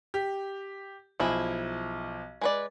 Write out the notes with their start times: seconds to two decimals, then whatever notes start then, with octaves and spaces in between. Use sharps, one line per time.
0.14 G4
1.20 B1 F3 E4 G#4
2.41 G#3 B4 D5